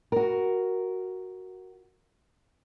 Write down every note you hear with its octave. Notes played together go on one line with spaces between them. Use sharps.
F#4 A#4